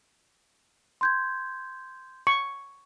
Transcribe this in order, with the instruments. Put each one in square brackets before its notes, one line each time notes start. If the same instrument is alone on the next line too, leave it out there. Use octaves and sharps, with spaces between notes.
[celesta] C6 G6 G#6
[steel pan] C#6